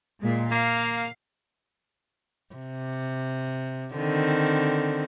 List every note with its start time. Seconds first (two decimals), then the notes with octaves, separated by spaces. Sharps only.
0.22 A#2 G#3
0.52 A#3 F5
2.55 C3
3.96 D3 D#3 C4